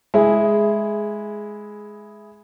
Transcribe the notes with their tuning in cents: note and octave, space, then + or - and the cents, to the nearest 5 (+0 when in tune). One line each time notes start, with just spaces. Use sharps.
G#3 +10 E4 +0 G#4 +0